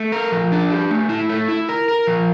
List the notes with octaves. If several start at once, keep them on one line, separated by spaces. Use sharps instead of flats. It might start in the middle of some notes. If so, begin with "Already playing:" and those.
Already playing: A3
A#4
F3
D4
G4
A3
E4
A3
E4
A#4
A#4
F3